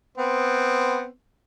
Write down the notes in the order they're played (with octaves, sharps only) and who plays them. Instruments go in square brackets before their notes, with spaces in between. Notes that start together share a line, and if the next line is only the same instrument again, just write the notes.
[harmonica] B3 C4